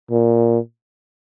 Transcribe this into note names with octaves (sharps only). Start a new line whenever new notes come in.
A#2